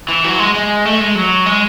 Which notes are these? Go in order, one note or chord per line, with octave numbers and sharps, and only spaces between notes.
E3
F#3
G#3
G#3
A3
G#3
F#3
G#3